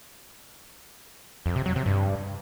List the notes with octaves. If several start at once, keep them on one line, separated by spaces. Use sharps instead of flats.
F2
C3
F#3
C3
G2